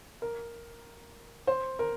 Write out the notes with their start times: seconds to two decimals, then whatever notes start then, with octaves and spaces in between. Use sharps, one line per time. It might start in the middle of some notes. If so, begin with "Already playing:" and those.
0.22 A#4
1.47 C5
1.79 A#4